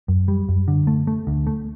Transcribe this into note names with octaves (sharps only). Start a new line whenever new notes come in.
F#2
G3
F#2
D3
A3
A3
D2
A3